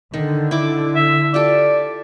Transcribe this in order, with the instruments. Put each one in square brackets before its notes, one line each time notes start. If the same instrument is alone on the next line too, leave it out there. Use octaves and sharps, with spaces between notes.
[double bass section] D3 [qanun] D#3
[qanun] E4 D6
[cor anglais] E5
[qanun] F4 G4 A4 [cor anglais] D5